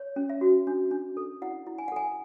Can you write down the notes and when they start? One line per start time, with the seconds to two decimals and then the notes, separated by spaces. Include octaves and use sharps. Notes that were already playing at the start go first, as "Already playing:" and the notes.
Already playing: C#5
0.16 C#4
0.29 E5
0.41 F#4
0.67 D4
0.91 D4
1.17 A4
1.42 E4 F#5
1.66 E4
1.78 G#5
1.88 F#5
1.92 A4 G#5